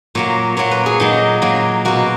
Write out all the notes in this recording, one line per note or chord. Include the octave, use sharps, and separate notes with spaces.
A#2 F#3 A#3 C#5
A#2 F#3 A#3 C#5
B4
G#4
A#2 F#3 A#3 D#4
A#2 F#3 A#3
B2 A#3 F#4